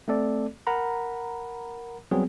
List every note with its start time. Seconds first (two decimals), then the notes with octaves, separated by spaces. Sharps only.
0.08 A3 C4 A4 D5
0.67 A#4 F#5 A#5 B5
2.11 F#3 G3 B3 C4 G#4